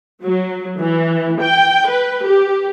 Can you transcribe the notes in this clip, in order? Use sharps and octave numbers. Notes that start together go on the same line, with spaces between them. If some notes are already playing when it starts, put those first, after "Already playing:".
F#3
E3
G5
B4
G4